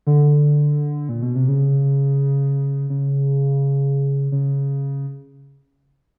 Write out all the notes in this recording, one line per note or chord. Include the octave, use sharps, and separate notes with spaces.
D3
A#2
B2
C3
C#3
C#3
C#3